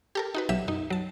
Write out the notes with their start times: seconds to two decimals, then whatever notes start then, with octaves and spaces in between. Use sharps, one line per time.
0.15 G4 A4 A#4
0.34 D#4 F#4 B4
0.49 B1 F#3 G4 E5 E7
0.68 F#2 D#4
0.90 F#3 A5